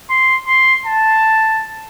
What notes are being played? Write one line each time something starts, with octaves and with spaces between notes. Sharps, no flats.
C6
C6
A5